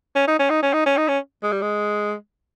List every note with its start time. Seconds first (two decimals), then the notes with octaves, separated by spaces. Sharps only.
0.15 C#4
0.27 D#4
0.39 C#4
0.50 D#4
0.62 C#4
0.73 D#4
0.86 C#4
0.97 D#4
1.08 C#4
1.43 G#3
1.52 G3
1.61 G#3